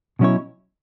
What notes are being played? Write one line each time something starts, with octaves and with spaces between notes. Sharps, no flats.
B2 F#3 C#4 E4 C#5